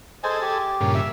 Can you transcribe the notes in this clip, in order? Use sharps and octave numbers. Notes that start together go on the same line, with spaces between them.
G#4 A4 C5 D#5 G#5
G4
G2 A#2 C#3
E5